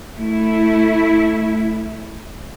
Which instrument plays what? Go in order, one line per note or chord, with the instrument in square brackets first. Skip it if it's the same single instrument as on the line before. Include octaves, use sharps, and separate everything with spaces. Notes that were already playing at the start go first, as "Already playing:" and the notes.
[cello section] A3 E4